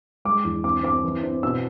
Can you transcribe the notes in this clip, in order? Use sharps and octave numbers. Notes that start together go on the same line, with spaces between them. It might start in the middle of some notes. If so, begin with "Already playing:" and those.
G#3 D6
E2
C4 D6
C4 D6
E3
C4
B2 E6